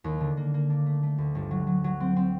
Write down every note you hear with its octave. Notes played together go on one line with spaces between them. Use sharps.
D#2
D3
A#3
A#3
D4
A3
A3
D2
G1
F#3
F#3
F#3
C4
C4